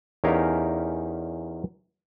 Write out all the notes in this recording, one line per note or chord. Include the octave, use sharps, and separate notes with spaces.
E2 C#4 D#4 G4 A#4 F5